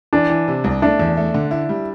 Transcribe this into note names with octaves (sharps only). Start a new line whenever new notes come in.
E3 D4
E3
C3
C2
A3 D4
E2
A3
D3
E4
G3